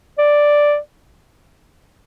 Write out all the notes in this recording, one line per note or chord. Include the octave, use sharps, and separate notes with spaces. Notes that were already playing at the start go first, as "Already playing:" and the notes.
D5